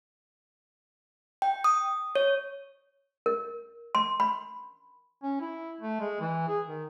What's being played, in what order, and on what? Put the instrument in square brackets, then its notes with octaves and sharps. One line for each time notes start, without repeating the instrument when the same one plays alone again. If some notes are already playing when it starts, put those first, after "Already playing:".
[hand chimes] G5
D#6
C#5
[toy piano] A#4
C6
B5
[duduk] C#4
E4
A3
G#3
E3
G#4
D#3